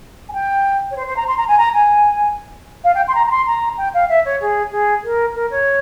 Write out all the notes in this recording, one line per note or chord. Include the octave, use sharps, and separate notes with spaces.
G#5
G5
C#5
C5
C5
A#5
C6
A#5
G#5
A#5
G#5
F5
G5
C6
A#5
A#5
C6
A#5
G5
F5
E5
C#5
G#4
G#4
A#4
A#4
C#5